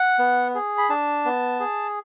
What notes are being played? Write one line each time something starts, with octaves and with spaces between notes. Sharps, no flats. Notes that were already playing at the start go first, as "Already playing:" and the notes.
Already playing: F#5
B3
G#4
B5
D4 A5
B3
G#4